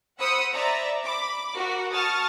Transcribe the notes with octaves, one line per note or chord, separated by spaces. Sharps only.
C5 F#5 B5 D#6 E6 C#7
C5 D5 E5 A#5
B5 D6
F#4 A#4
A5 C#6 D#6 F6 A6